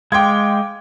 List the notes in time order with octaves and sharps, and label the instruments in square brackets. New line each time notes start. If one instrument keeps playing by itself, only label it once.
[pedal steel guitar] G#3 [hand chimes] F5 C6 D6 [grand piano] G5 G#6